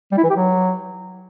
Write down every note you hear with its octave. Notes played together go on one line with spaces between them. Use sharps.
G3
E4
E3
G4
F#3